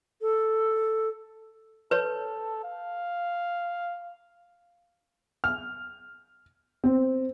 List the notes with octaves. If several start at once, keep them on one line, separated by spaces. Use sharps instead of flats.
A4
A4 B4 C#5
F5
F6
C4